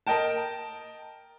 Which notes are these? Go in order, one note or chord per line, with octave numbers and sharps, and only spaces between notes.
A#4 D#5 G5 A5